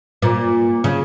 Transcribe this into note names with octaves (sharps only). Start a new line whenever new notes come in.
A#2
C#3